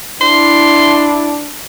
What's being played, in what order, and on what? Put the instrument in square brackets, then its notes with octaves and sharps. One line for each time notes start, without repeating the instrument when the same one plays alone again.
[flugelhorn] D4 [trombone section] E4 [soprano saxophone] C6